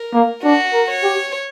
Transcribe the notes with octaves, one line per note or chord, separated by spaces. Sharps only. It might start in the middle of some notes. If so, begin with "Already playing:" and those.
Already playing: A#4
A#3
D4 F#4
A#4
C#5
G4